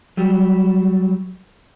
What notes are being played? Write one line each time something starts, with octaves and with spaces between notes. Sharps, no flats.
F#3 G3